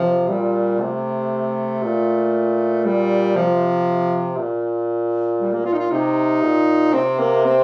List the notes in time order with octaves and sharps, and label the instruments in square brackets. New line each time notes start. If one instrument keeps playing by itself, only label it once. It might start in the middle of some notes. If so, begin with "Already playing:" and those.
Already playing: [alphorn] C3 [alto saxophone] F3
[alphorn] A#2 [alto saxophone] G3
[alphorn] C3 [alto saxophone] A3
[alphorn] A#2
[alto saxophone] G3
[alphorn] C3 [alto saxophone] F3
[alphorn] A#2
[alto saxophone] G3
A#3
F4
D#4
F4
[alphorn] C3 [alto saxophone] D#4
[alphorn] A#2
[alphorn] C3 [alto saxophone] C4
[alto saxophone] A#3
C4